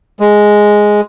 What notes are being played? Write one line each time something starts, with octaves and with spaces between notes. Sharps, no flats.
G#3